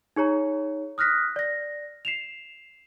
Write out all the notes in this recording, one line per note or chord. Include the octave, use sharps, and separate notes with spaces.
D#4 G#4 C#5 A#5
D#6 F6 F#6 A#6 B6
D5 A#6
C7 E7 F7